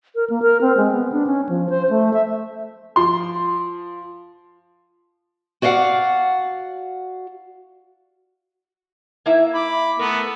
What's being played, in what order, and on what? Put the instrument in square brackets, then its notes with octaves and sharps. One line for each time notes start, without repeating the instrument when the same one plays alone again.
[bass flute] A#4
A#3
A#4
C4
G#3
B3
D4
C#4
F3
C5
A3
E5
[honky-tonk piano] F3 C6
[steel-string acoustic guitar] F#4 D5 D#5 F5 F#5
[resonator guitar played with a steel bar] A#3 E4 E5
[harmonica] B5 D6
[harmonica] A3 B3 [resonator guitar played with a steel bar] A#4